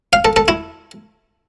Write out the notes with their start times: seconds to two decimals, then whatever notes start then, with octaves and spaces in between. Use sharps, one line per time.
0.13 F5
0.25 A4
0.36 A4
0.48 E4